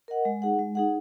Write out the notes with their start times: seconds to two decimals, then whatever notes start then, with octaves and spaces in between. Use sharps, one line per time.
0.08 A#4 D#5 F#5
0.25 G#3
0.42 D#4 G#4 F#5
0.59 G#3
0.75 D#4 G#4 F#5